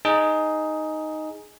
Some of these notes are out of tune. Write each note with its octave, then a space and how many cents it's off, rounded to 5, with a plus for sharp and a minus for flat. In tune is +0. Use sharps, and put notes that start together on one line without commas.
D#4 +0 G#4 +10